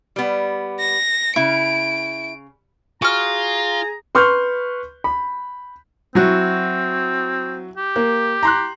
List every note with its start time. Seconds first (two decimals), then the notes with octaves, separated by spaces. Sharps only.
0.16 G3 B3
0.80 A#6
1.36 C#3 E4 D7
3.02 F4 F#4 G#4 A#5 F6
4.15 B4 C6 C#6 F6 G6
5.04 B5
6.15 F#3 C4 E4 F#4
7.77 G4
7.96 A#3
8.43 A#5 C6 F#6